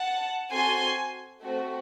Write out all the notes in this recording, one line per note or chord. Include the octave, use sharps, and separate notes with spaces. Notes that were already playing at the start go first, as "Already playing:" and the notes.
Already playing: F#5 A5
C4 F#4 A4 G#5 C6
A3 C4 F#4